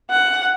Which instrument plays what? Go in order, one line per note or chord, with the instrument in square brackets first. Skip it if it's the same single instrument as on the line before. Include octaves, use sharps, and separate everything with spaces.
[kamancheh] F#5